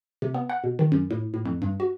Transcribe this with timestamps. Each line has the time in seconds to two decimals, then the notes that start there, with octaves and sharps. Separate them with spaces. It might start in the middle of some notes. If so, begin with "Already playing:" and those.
0.22 C3
0.34 B3
0.50 F#5
0.64 B2
0.79 D#3
0.92 F#2
1.11 A2
1.34 A2
1.46 F2
1.62 G2
1.80 F#4